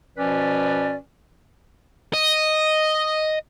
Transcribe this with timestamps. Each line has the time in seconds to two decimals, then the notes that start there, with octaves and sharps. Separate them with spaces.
0.17 B2 F3 C#4 B4 D5
2.14 D#5